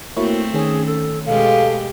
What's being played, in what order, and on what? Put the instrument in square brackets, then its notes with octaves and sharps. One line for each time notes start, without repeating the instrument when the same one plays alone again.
[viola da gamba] A3 C4 [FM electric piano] A#3 E4 C#5 [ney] F#4
[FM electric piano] D#3 C#4 [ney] G#4
[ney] A4
[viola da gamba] B2 G#3 G4 [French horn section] A4 [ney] F5